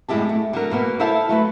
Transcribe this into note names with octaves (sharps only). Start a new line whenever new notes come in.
F#2 A2 G#3 E4 G4 A5
A3
D3 F#3 A#4
B2 A#3 B3
E4 A4 C5 E5 F5 A5
F#3 A3 B4